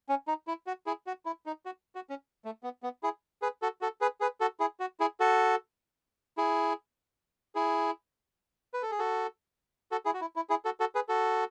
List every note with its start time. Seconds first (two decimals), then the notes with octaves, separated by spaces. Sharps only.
0.09 C#4
0.28 D#4
0.47 E4
0.67 F#4
0.86 E4 G#4
1.07 F#4
1.26 E4
1.46 D#4
1.66 F#4
1.95 F#4
2.10 C#4
2.45 A3
2.63 B3
2.83 B3
3.03 E4 G#4
3.42 G#4 B4
3.62 F#4 A4
3.81 F#4 A4
4.01 G#4 B4
4.21 G#4 B4
4.40 F#4 A4
4.60 E4 G#4
4.80 F#4
5.00 E4 G#4
5.20 F#4 A4
6.38 E4 G#4
7.55 E4 G#4
8.74 B4
8.82 A4
8.91 G#4
8.99 F#4 A4
9.92 F#4 A4
10.05 E4 G#4
10.14 F#4
10.21 E4
10.36 E4
10.50 E4 G#4
10.65 F#4 A4
10.80 F#4 A4
10.95 G#4 B4
11.09 F#4 A4